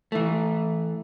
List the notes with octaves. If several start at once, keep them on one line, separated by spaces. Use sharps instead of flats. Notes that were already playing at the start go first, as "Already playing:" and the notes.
E3 A3